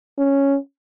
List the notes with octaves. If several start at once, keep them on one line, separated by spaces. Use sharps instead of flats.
C#4